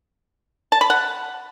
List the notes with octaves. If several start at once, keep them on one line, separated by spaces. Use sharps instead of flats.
A5
B5
F#5